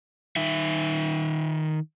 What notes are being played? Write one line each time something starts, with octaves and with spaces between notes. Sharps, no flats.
D#3 D#4 E5